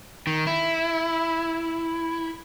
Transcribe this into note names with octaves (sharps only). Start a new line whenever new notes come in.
D#3
E4